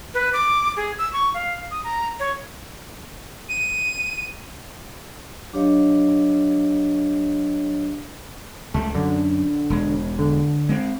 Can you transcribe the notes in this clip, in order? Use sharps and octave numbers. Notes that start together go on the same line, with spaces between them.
B4
D6
G#4
E6
C#6
F5
D#6
A#5
C#5
D#7
F#3 D4 G4 C#5 D#5 F5
C#2 G3 A3
F#2 D3
E1 G#3
D3
G#3 C4